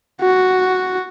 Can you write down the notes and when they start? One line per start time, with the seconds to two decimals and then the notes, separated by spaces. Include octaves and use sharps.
0.22 F#4